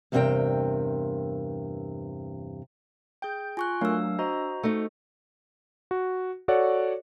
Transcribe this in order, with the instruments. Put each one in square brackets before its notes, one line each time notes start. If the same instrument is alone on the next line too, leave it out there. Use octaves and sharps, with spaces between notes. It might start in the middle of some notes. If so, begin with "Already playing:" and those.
[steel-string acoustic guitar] E2 G2 C3 C4 A#4 G5
[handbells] G#4 G5 [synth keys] G6
[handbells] F4 [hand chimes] G#5 C#6 F#6
[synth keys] F#3 A3 A#4 [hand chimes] D4 E6 [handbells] F5
[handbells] F#4 C5 A#5 [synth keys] D#5
[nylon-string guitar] A3 D#4
[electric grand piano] F#4
F#4 A4 C#5 D5 F#5